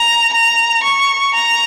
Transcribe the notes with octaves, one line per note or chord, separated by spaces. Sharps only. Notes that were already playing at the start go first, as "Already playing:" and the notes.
Already playing: A#5
A#5
C#6
A#5